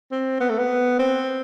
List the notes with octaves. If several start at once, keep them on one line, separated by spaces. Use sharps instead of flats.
C4
B3
A3
B3
C4